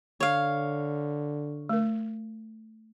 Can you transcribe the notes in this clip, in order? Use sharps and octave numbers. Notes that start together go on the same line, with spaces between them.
D3 C#5 F5
A3 A#4